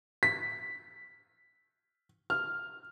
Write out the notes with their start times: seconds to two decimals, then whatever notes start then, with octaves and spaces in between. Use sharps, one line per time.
0.23 B6
2.30 F6